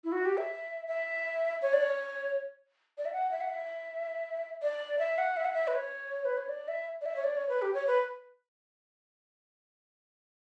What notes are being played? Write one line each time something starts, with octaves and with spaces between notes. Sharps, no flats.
E4
F#4
G4
E5
E5
C#5
D5
C#5
D5
E5
F#5
E5
F#5
E5
D5
E5
F#5
E5
F#5
E5
B4
C#5
B4
C#5
D5
E5
D5
E5
C#5
D5
C#5
B4
G4
C#5
B4